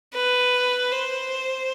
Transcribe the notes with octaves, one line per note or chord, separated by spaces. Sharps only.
B4
C5